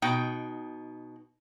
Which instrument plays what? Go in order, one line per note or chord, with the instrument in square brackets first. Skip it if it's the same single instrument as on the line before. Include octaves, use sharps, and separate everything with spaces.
[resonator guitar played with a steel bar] B2 D#4 G5